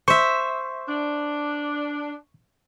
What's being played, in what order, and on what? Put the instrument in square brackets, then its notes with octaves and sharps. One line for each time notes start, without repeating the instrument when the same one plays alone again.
[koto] C5 E5 [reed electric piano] C#6
[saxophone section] D4